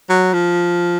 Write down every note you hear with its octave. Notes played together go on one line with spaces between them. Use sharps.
F#3
F3